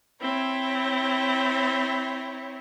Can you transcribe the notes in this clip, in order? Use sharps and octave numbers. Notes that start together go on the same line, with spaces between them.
C4 E4 C#5